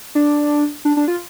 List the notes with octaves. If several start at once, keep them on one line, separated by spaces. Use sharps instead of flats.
D4
D4
D4
F4